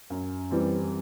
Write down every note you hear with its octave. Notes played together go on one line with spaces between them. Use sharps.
F#2
E3 G3 C4